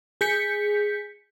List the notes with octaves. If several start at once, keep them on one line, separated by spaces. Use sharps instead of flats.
G#4 G6 B6 C#7